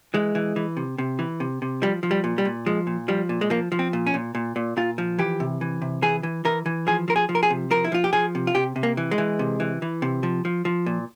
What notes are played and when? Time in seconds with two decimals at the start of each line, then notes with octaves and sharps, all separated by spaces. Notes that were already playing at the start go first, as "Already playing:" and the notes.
0.14 E3 G#3
0.35 E3
0.56 E3
0.77 C3
0.98 C3
1.19 E3
1.40 C3
1.62 C3
1.82 F3 G3
2.03 F3
2.11 G3
2.24 A#2
2.38 G3
2.45 A#2
2.66 F3 G#3
2.87 A#2
3.08 F3 G3
3.29 A#2
3.41 G#3
3.50 F3 A#3
3.72 F3
3.79 C4
3.93 A#2
4.07 C#4
4.14 A#2
4.35 A#2
4.56 A#2
4.77 A#2 F4
4.98 F3
5.19 E3 G4
5.40 C3
5.61 E3
5.82 C3
6.02 E3 G#4
6.23 E3
6.45 E3 A#4
6.66 E3
6.87 F3 G#4
7.08 F3 A#4
7.16 G#4
7.29 F3
7.35 A#4
7.43 G#4
7.50 C3
7.71 F3 A#4
7.84 E4
7.92 F3 F4
8.04 G4
8.13 F3 G#4
8.35 C3
8.47 F4
8.55 C3 G4
8.76 C3
8.83 A#3
8.97 E3
9.11 G#3
9.18 E3
9.39 C3
9.60 E3
9.82 E3
10.02 C3
10.23 F3
10.45 F3
10.65 F3
10.86 A#2